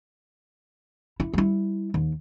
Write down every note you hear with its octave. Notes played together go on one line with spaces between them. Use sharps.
E4
G3 E4
D#2